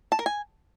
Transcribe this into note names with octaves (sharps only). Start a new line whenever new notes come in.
A5
A#4
G#5